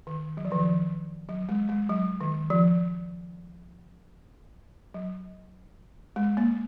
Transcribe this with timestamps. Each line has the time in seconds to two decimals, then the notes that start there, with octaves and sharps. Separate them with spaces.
0.07 D#3
0.37 F#3
0.45 F3
0.52 D#3
0.59 F3
1.29 F#3
1.49 G#3
1.69 G#3
1.89 F#3
2.21 D#3
2.50 F3
4.94 F#3
6.16 G#3
6.37 A#3